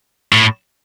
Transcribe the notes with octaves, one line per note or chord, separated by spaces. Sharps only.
A2